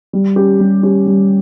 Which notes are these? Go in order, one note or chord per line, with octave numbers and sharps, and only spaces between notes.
G3
C#4 G4
G3
C#4 G4
G3